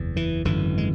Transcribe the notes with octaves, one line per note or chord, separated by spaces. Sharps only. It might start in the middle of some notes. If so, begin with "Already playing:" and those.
Already playing: F#1 E2
E3
G#1 F#2 D3 E3
G#3